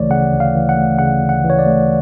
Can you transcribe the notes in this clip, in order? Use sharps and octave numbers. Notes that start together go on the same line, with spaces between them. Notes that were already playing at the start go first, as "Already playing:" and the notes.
Already playing: D2 C#3 E3 A3 C#5 D5
C#3 F#5
D2
F5
E3
F#5
A3
C#3 F#5
D2
F#5
E3
C#5
D5
A3